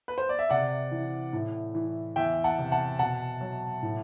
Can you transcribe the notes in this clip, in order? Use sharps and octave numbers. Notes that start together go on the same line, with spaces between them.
B4
C5
D5
E5
C3 D5 F#5
E3
A2
E3
E2 E5 G5
F#5 A5
C3
F#5 A5
B2 F#5 A5
F#3
A2